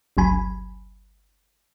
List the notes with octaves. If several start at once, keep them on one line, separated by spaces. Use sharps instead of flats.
G1 C#2 F#3 G#5 B5